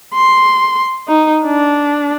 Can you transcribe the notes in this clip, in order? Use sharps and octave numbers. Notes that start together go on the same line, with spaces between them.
C6
D#4
D4